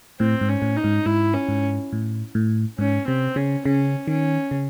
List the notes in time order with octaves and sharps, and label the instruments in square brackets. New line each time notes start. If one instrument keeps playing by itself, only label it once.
[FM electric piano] A2 [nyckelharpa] C4
[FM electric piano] G#2
[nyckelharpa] C#4
[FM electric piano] A2
[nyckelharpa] D#4
[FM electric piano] G#2
[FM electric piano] G#2 [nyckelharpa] E4
[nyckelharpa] C#4
[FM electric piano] G#2
A2
A2
[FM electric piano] G#2 [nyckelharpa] C#4
[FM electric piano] C3 [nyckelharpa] C4
[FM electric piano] C#3 [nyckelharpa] C#4
[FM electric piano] C#3 [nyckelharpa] C#4
[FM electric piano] D#3 [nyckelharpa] C#4
[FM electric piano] C#3